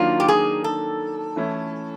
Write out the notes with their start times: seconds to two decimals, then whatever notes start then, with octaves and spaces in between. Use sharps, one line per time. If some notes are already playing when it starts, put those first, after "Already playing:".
Already playing: D#3 F#3 A#3 D4 F4
0.20 G4
0.28 G#4
0.64 A4
1.36 E3 A3 C#4 E4